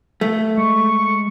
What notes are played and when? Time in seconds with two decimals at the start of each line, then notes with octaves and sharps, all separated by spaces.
0.21 A3
0.58 G#3 C#6